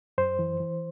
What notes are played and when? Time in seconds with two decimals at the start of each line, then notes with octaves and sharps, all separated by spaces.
0.18 F#2 C5
0.39 E3
0.60 E3